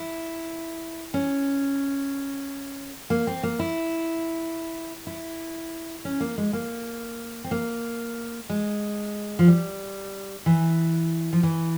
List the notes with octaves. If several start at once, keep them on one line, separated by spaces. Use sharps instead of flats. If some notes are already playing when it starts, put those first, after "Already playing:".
Already playing: E4
C#4
A#3
C4
A#3
E4
E4
C#4
A#3
G#3
A#3
C4
A#3
G#3
F3
G3
E3
F3
E3